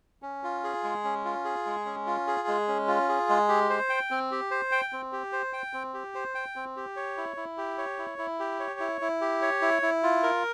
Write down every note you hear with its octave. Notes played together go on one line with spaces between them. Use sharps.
C#4
F4
G#4
G#3
C#4
F4
G#4
G#3
C#4
F4
G#4
G#3
C#4
F4
G#4
G#3
G4
C5
G5
C4
G4
C5
G5
C4
G4
C5
G5
C4
G4
C5
G5
C4
G4
C#5
E4
E4
G4
C#5
E4
E4
G4
C#5
E4
E4
G4
C#5
E4
E4
F4
A#4